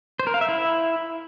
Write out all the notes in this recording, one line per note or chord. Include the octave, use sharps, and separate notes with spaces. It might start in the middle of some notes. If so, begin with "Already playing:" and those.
C5
A#4
F5
E5
E4